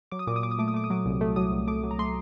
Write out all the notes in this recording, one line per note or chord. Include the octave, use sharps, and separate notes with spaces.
F#3 D6
D#6
A#2 D6
D#6
A#2 D6
D#6
A3 D6
D#6
A3 D6
D#6
F#3 D6
C2
A3
F#3 D#6
C2
A3 D6
F#3
A#5
A3 C6